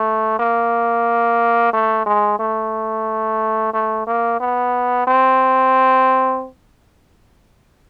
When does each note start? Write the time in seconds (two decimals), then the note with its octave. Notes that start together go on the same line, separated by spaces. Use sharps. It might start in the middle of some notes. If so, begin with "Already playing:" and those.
Already playing: A3
0.39 A#3
1.73 A3
2.06 G#3
2.39 A3
3.73 A3
4.07 A#3
4.40 B3
5.07 C4